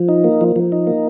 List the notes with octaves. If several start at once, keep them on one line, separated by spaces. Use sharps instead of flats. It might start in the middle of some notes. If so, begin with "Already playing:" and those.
Already playing: F3
D#4
A#3
F3
F3
D#4
A#3